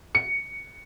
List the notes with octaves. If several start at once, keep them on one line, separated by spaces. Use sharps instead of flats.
C#7